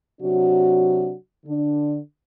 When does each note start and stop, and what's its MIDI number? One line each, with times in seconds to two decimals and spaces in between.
0.21 1.14 48
0.21 1.14 54
0.21 1.14 62
0.21 1.14 66
1.46 1.98 50
1.46 1.98 62